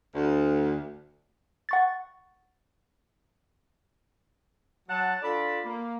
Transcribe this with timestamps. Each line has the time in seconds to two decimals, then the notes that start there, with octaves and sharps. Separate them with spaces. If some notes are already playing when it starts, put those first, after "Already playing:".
0.15 D2
1.69 F#5 C#6 A6
4.88 F#3 F#5 A5
5.22 D4 F4 A4 D5 B5
5.65 A#3